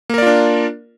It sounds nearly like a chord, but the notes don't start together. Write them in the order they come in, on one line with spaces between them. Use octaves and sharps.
A#3 A#4 D5 F4 D4